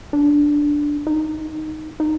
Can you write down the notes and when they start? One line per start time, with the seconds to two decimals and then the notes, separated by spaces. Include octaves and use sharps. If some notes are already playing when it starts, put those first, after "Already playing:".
0.13 D4
1.07 D#4
2.00 D#4